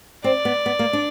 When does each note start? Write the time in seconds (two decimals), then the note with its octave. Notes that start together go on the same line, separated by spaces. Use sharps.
0.24 C4 D5
0.45 B3
0.66 B3
0.79 A#3
0.93 D4